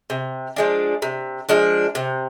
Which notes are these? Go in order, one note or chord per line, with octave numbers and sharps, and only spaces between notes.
C3
F3 G#3 D4
C3
F3 G#3 D4
C3